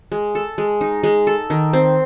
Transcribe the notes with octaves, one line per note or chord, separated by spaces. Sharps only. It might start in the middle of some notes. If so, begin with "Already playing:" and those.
G#3
A4
G#3
D#4
G#3
A4
D#3
C4